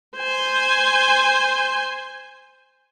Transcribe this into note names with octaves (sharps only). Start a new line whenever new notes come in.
C5 G#5